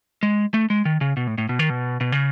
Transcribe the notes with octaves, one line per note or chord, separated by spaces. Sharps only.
G#3
A3
G#3
D#3
C#3
B2
A2
A2
B2
D#3
B2
B2
C#3